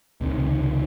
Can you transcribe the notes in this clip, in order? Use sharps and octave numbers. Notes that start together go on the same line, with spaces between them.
C#2 C3 D#3